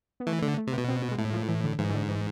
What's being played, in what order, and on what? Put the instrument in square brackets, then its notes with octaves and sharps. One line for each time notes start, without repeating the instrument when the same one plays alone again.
[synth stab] B3
[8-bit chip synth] E3 [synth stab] A3
[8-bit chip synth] D3 [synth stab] A3
[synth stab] A3
[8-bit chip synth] C3
[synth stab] B3
[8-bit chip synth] B2
[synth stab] C4
B3
G#3
[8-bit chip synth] A2 [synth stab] A3
[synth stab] F3
E3
D3
[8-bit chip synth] G#2 [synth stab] E3
[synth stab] E3
D3
E3